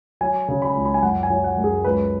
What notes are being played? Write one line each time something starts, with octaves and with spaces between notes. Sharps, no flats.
F#3 G#5
C#3
B5
C#2
B5
G#5
F#2 F#5
G#5
F#3
F#5
F#2
G#4
C#2 B4